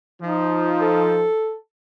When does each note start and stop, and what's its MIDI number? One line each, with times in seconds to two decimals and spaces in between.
0.21 1.24 53
0.21 1.28 63
0.81 1.55 69